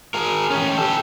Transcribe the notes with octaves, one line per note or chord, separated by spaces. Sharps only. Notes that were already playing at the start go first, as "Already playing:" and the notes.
G#4 A#4
C#4 G4
G4 A4